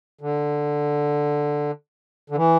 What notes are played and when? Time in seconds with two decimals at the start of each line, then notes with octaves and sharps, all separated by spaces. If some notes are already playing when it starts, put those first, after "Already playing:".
0.21 D3
2.30 D3
2.36 E3